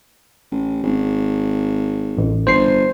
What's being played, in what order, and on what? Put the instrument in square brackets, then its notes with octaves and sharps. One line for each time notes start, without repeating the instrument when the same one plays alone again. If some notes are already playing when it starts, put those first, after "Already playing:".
[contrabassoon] A1
G#1
[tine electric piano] A1
[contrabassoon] G1 [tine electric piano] C5 C7